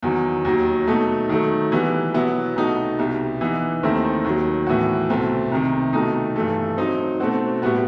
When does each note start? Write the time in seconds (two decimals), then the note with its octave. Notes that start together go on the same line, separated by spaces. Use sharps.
0.02 E2 D#3 F#3
0.45 D#2 D#3 F#3
0.87 B2 F#3 A3 D#4
1.29 D#3 F#3 A3
1.72 E3 G3 B3
2.14 B2 F#3 B3 E4
2.56 C2 B2 A3 D#4 F#4
2.98 C2 B2 G3
3.41 E3 B3 D#4
3.83 D#2 D#3 A3 C4 E4
4.24 D#2 D#3 F#3
4.67 A2 E3 B3 F#4
5.09 C2 B2 A3 C4
5.52 C2 C3 D#3
5.93 C2 B2 A3 D#4
6.36 G2 E3 A3
6.77 F#3 C4 D#4
7.20 B2 A3 C4 F#4
7.62 A2 G3 B3 F#4